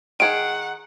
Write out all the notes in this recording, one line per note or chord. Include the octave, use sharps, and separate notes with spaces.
D#3 G#4 F#5 D7